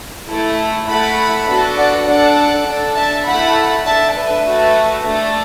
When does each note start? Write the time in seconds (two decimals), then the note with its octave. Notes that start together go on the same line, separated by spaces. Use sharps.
0.29 A3 E4 A4
0.88 A3 E4 A4 F#5 B5
1.48 B3 D4 F#4 A4
1.77 D5 F#5
2.06 D4 A4 D5 F#5
2.66 D4 A4
2.96 E5 A5
3.26 A3 E4 A4 F#5 B5
3.85 D4 A4 E5 A5
4.15 B4 E5
4.45 A3 F#4 A4
5.05 A3 D4 A4